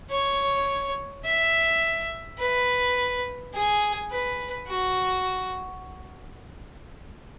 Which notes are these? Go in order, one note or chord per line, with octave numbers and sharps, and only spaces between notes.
C#5
E5
B4
G#4
B4
F#4